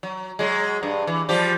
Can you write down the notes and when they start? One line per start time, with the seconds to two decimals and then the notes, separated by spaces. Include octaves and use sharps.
0.03 F#3
0.39 F#3 G#3
0.83 G2
1.07 E3
1.29 F3 G3 G4